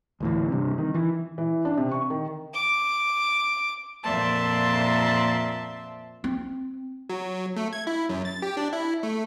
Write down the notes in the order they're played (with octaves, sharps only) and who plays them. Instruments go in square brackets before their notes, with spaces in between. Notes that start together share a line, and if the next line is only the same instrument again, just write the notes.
[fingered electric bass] D2 A2 E3
G2 C3
D#3
E3
[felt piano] E3
D4
C3
C#6
D#3
[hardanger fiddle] D6
[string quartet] F2 A#2 D5 E5 A5 C6
[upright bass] C4
[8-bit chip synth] F#3
A3
G#6
E4
F#2
A6
G4
D4
E4
A3